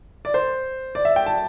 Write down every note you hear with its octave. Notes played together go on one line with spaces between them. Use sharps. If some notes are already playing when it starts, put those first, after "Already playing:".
D5
C5
D5
E5
G5
A5